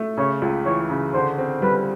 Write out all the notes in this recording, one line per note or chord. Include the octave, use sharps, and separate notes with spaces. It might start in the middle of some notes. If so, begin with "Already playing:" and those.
Already playing: A3
C#3 C#5
C#2
E3 C#5
C#3
D3 C5
C4
G3 B4